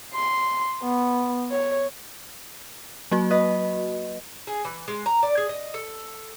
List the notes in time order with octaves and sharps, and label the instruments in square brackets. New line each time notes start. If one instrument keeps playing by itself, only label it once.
[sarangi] C6
B3
C#5
[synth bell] F#3 A#3 F#4
[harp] B4 D#5
[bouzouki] G#4
E3
G#3
A#5
D5
G#4
D#5
A4